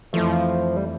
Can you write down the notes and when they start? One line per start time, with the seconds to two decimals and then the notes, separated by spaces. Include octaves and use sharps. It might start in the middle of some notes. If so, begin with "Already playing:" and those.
0.13 F2 E3 F3 A3
0.76 G3